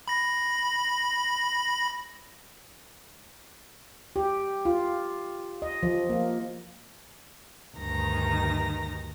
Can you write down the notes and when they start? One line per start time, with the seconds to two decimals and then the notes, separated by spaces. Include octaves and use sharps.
0.08 B5 A#6
4.16 G4
4.65 F4
5.62 D#5
5.83 F3
6.10 A#3
7.76 D2 G2 D#3 A#5 A#6